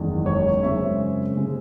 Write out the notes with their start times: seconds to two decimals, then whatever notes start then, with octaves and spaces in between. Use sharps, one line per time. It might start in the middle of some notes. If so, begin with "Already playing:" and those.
Already playing: F#1 E2 D#3 G#3
0.26 C#5
0.63 F#2 C#3 G#3 C4 E5
1.36 C#3 G#3 C4